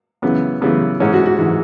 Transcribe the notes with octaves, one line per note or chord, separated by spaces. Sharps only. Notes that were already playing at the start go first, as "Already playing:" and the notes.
F#2 C#3 E3 B3
F#2 C#3 E3 B3
G#2 E3 C#4
F#4
F#4
G#2 E3